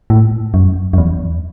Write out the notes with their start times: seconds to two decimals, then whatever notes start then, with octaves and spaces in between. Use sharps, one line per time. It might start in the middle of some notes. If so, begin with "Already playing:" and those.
0.10 A2
0.54 F#2
0.93 F#2
0.98 E2